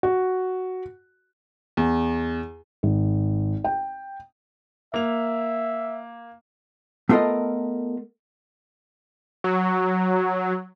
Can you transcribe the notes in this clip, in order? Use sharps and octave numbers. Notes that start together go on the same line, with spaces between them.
F#4
E2
G#1
G5
A#3 E5 F7
A3 B3 F4 A4 A#4 D#5
F#3